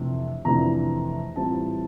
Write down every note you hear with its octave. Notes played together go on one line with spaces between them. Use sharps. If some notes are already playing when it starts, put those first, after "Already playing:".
Already playing: F2 C3 E3 A3 D4
F2 C3 E3 A3 D4 A#5
A2 E3 G3 C4 F4 A5